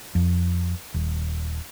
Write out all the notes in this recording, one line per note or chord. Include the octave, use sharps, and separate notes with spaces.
F2
D#1